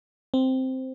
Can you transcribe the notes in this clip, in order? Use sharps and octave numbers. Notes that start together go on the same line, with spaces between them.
C4